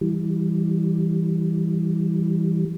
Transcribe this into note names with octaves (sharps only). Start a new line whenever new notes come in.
E3 G3